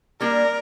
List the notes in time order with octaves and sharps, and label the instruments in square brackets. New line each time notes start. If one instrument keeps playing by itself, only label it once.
[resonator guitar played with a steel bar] G3 A#3 D4 [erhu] A#4